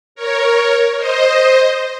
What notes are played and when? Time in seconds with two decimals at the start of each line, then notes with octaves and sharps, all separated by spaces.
0.15 A#4 C#5
0.98 C5 D#5